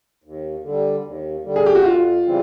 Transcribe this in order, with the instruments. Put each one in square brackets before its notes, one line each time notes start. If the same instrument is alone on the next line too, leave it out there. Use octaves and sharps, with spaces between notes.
[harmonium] D#2
D3 G3
D#2
D3 G3
[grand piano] G#4
G4
F#4
[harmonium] F2 [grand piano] F4
[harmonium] C#3 E3 G3 C4